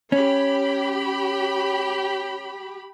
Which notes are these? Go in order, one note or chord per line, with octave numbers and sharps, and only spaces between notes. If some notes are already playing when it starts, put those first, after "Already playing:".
C#4 G4 B5